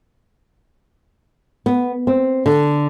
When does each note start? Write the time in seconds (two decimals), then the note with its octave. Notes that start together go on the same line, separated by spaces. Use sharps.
1.66 B3
2.07 C4
2.46 D3